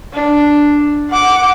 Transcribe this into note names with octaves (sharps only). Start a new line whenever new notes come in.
D4
F#5 D6